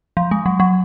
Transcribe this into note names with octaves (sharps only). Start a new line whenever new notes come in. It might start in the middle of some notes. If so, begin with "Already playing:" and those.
F3
G#3
F#3
F#3